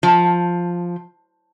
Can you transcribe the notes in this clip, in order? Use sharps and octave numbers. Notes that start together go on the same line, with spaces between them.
F3